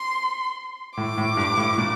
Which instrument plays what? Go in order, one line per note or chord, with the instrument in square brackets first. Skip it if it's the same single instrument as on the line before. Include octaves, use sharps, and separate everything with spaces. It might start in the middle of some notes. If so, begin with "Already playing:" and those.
Already playing: [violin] C6
[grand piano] A2 [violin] D6
[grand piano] A2
G2
A2
A#2